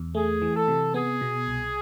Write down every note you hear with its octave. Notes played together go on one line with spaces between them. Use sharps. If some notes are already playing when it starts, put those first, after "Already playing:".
Already playing: E2
A3 G#4
E3
A4
C3
B3 G#4
B2
C2